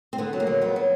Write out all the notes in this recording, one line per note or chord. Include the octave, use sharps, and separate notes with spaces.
C4
D3 B3
F#3
A#3
F#3
F2 B3
F#3